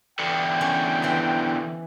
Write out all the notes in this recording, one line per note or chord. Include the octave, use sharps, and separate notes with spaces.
E2 D3 G5
C#4
E3 C5 F#5